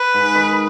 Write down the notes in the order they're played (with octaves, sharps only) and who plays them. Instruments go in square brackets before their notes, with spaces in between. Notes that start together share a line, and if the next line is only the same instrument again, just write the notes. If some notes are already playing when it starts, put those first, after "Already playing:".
Already playing: [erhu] B4
[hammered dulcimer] G#2
D#3